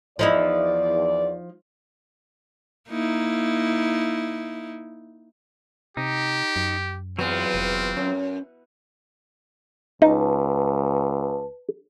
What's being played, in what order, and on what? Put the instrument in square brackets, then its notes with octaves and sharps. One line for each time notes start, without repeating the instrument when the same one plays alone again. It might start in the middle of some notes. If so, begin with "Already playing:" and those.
[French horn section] E2 D5 [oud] F3 D#4 E4
[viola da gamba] A#3 D#4 E4
[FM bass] C3 [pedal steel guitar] D#4 [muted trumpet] G4
[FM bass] F#2
[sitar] E2 B3 [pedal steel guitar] F#3 F4 [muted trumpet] C4
[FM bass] F1
[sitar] F#2 [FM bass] C#4
[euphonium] C#2 [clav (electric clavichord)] D#4 [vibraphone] B4 A5